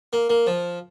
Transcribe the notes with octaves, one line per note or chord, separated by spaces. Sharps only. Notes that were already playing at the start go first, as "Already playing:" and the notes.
A#3
A#3
F3